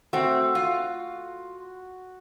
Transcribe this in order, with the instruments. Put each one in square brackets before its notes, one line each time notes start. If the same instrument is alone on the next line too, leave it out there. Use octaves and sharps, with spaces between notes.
[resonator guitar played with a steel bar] A3 C4 [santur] F#4
[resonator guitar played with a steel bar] F4